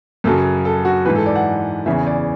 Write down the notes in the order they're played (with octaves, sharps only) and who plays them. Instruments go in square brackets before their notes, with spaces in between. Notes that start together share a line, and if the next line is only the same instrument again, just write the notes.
[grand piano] F#2 C#3 F#3 A4
A4
F#4
G#2 E3 B4
A4
D5
F#5
E2 C#3 E3 E5
D5